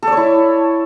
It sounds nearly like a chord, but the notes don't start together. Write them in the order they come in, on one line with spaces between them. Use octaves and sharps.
A4 D5 C#5 E4